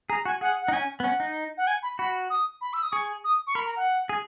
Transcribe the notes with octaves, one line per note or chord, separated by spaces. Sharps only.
G#4 A#5
F#4 G#5
G#4 F#5
F#5
D#4
C#4 G#5
B3
C#4 F#5
D#4
F#5
G#5
B5
F#4 B5
D#6
B5
E6
D#6
G#4 C#6
D#6
C#6
A#4 B5
A#5
F#5
G#4